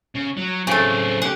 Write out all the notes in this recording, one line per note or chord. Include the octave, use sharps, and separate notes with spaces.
C#3
F#3
C#3 F#3 A3 C4
G4 G#4 F#5